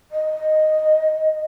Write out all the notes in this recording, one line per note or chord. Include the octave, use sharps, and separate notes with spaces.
D#5